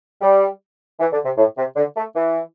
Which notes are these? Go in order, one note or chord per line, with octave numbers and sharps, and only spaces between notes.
G3
E3
D3
C3
A2
C3
D3
A3
E3